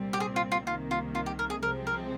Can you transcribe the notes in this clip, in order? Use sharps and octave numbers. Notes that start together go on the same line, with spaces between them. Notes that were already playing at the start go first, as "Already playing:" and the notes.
Already playing: C2 A#2 G3 C4
G4
G#4
F4
F4
C2 C3 D#3 A#3 F4
F4
F4
G4
A#4
G#4
C2 C3 F3 G#3 C4 A#4
A#4